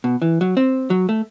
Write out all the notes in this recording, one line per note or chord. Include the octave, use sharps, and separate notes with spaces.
B2
E3
F#3
C4
F#3
A3